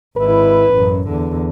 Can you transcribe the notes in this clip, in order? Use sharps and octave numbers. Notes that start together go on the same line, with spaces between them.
G#1 E4 B4
A1 F#2
E2 D3